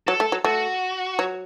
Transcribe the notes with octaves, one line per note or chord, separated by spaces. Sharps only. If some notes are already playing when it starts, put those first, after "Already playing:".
F#3 A4
A3
F#3
A3 F#4
F#3